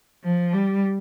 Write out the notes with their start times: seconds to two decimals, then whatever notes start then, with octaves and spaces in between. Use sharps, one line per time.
0.24 F3
0.53 G3